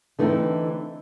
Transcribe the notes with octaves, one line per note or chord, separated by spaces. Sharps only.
D3 E3 A3 C4 D#4 E4